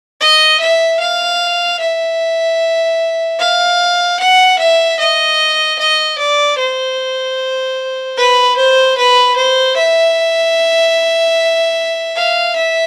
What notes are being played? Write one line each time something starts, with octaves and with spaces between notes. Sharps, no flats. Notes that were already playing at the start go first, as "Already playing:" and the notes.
D#5
E5
F5
E5
F5
F#5
E5
D#5
D#5
D5
C5
B4
C5
B4
C5
E5
F5
E5